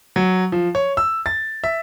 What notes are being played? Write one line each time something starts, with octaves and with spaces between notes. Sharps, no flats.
F#3
F3
C#5
E6
A6
E5